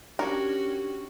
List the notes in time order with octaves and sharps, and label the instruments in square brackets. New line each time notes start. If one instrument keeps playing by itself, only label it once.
[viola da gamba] C#4 F#4 [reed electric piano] D4 C#6 G#6 [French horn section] G4 [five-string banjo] A#4